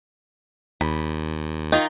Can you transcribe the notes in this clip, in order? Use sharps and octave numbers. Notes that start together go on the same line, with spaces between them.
D#2 B5
D#3 D#4 F4